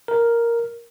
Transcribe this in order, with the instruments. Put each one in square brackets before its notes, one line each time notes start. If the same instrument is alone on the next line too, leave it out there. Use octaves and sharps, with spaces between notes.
[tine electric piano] A#4